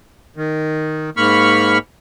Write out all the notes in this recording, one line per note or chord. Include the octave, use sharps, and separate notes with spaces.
D#3
G#2 A#3 B5 C#6 F6